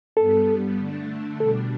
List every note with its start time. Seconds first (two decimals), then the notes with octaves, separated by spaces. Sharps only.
0.16 G2 G3 B3 A4
0.78 D3 A3 D4
1.40 B2 G3 D4 A4